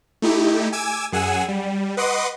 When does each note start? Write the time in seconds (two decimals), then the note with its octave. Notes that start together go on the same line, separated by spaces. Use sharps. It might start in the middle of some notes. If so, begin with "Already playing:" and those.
0.22 A3 D#4 E4 G4
0.73 G#5 D6 E6 G#6
1.12 F#2 G#4 F#5 G#5 E6
1.49 G3
1.97 B4 D#5 F#5 C6 D6 D#6